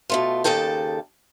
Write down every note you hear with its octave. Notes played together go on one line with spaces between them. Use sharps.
B2 A3 F4
D#2 G#2 C#3 A4 G5 A5